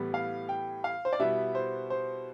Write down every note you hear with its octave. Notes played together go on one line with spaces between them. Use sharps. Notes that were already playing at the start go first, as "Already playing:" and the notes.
Already playing: A2 E3 G3 B3
F5
G5
F5
C5
D5
B2 G3 B3 E4 E5
C5
C5